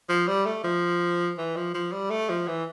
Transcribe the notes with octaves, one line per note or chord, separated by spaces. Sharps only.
F3
G3
A3
F3
E3
F3
F3
G3
A3
F3
E3